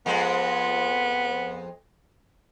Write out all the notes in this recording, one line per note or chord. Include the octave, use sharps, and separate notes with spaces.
F2 G#3 B3